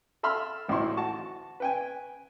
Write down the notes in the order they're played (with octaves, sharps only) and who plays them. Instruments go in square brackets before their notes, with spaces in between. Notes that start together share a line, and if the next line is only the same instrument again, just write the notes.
[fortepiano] A4 E5 B5 C6 E6 F6
A1 D2 D#4 E4 C6 C#6
F#4 A5 C#6
B4 G5 G#5